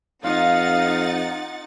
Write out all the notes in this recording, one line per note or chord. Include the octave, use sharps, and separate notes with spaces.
F2 D#4 F4 D#5 F5 F#5 A6